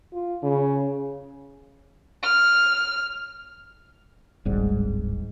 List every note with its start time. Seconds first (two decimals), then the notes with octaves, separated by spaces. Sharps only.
0.13 F4
0.43 C#3
2.23 F6
4.45 D1 G#1 G#2 G3